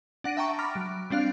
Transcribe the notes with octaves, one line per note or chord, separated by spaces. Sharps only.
D4 F#5 A#6 D7 D#7
E5 F#5 G5 A5 A#5 C#6
B5 C#6 D6 F6 A6 A#6
F#3 D7
G3 C4 D4 F5 F#6